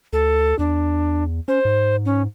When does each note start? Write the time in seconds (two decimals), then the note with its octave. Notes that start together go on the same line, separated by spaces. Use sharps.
0.13 D2 A4
0.59 E2 D4
1.48 C#4 C5
1.65 G#2
2.05 C#4